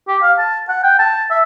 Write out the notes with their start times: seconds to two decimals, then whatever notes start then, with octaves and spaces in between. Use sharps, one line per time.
0.08 G4
0.22 F5
0.39 A5
0.69 F#5
0.83 G5
0.99 A5
1.30 E5